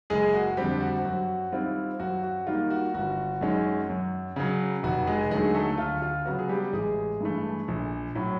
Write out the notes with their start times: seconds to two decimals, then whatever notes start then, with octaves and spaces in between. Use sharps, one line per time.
0.10 F#1 G#3 G#4
0.34 F#4
0.57 F2 D3 G3 C4 G4
0.81 F#4
1.05 F#2 F#4
1.52 D#3 G3 C4 E4 F4
2.00 F#2 F#4
2.24 F#4
2.47 D#3 G3 A#3 F4
2.70 F#4
2.94 G1 F#4
3.41 F#2 D#3 G#3 C#4
3.89 F#2
4.36 C#3 F#3
4.83 F1 F#4
5.07 G#3 G#4
5.31 D#2 D3 F#3 G#3 A3 G#4
5.54 A3 A4
5.78 D2 F4
6.02 F4
6.25 C#3 F#3 B3 F#4
6.39 G#4
6.49 G3 G4
6.73 A1 G#3 G#4
7.21 G2 E3 A3
7.68 A#1
8.15 A2 F#3